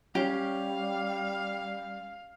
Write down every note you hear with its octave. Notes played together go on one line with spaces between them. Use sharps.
G3 C#4 G4 F5